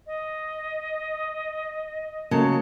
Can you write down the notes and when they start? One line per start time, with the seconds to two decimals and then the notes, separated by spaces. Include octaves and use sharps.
0.07 D#5
2.31 C#3 F#3 A3 A#3 A5